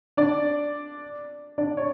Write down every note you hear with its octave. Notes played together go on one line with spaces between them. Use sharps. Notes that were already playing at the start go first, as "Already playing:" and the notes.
D4 D5
D4 D5
C#5